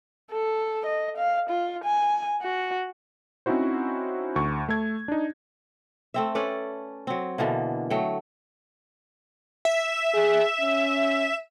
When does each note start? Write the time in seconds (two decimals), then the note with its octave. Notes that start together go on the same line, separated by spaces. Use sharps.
0.31 A4
0.86 D#5
1.17 F5
1.50 F4
1.85 G#5
2.42 F#4
3.46 C4 C#4 D#4 E4 F#4 C5
4.36 D2 C#6
4.69 A3 A4 G#6
5.08 D4 D#4
6.14 A3 C4 E5
6.35 C#4 A4 B4 D5
7.07 F#3 C4
7.38 B2 D3 E3 A#3
7.90 F#3 A3 G5
9.65 E5
10.14 G#4
10.61 C#4